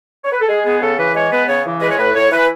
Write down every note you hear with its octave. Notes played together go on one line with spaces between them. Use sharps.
C#5
B4
A4
G#3 G#4
B3 G#4
C#3 A4
E3 B4
G#3 C#5
B3 B4
C#3 C#5
E3
G#3 B4
C#5
A2 B4
A2 C#5
E3 B4